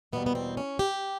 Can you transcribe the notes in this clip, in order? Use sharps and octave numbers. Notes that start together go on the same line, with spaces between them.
E2 B2 G3 A#3 B3
B3
C4
C#4
G4